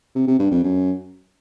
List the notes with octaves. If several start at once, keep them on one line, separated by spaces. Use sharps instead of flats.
C3
C3
G2
F2
F#2